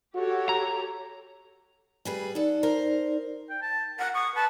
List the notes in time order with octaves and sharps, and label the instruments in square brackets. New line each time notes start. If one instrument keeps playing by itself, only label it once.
[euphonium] F#4 [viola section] G4 A4 C#5
[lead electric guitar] A#5
[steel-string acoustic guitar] G3 G#4 B4
[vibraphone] D#4 D5 [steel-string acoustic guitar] A4 F#5
[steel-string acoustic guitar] A#4 C5
[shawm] G5
A5
[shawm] A#4 [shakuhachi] F#5
[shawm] C#6 [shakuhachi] D#6
[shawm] B4 [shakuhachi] A5